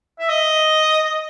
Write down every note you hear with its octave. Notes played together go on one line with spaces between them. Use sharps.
E5
D#5